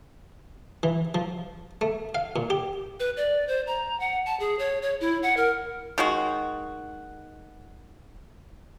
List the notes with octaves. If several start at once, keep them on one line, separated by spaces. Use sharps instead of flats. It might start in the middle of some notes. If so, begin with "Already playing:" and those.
E3
F3
A3
F5
A#2
G4
B4
D5
C5
A#5
F#5
A5
G#4
C#5
C#5
E4
F#5
A#4
D#3 G#3 F#4